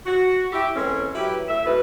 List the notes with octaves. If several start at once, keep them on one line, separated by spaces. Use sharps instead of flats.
F#4
E4 G4 E5
E3 G#3 A#3 C4 C#4 A4
F#3 E4 G4 B4
A2 E5
G#2 B2 B4